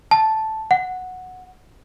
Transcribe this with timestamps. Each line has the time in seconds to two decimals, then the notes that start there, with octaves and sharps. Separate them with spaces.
0.11 A5
0.71 F#5